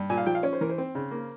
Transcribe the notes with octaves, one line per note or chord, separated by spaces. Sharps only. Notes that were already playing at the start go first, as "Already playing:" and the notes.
Already playing: G2
A#2 G#5
F5
F3 G5
F5
C#4 C#5
C5
E3 A#4
C5
C4
C#3
A#3